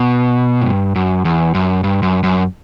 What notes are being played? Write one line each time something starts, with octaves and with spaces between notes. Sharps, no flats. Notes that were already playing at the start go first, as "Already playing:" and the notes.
Already playing: B2
A2
G2
F#2
E2
F#2
G2
F#2
F#2